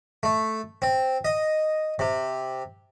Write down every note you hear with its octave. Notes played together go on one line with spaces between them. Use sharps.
A3
C4
D#5
C3